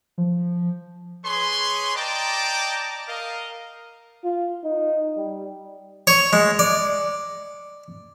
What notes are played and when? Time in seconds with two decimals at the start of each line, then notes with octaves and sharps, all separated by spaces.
0.18 F3
1.24 G#4 B4 C#5 C6
1.96 D5 D#5 G5 A5 A#5 D6
3.07 A#4 D#5 F5
4.24 F4
4.64 D#4
5.17 G3
6.07 C#5
6.33 G#3
6.59 D5